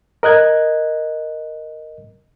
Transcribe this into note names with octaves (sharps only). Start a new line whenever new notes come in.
A#4 D#5 F#6 G#6